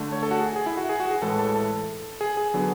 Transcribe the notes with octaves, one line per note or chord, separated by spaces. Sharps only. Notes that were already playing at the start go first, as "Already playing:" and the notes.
Already playing: D3 A3
C#5
A4
F#4
G#4
G#4
E4
F#4
G#4
F#4
G#4
A2 E3 G#3 A4
A4
A4
G#4
G#4
D3 F#3 B3